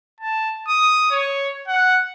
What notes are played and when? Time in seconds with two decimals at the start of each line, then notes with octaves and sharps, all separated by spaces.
0.20 A5
0.68 D#6
1.11 C#5
1.68 F#5